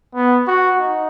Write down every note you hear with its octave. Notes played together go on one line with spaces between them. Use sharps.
B3
F#4
D#4